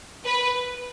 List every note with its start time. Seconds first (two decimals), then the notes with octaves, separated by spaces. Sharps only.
0.24 B4